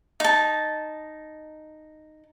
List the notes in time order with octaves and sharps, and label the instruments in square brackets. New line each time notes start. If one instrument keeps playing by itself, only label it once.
[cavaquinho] D#4 A5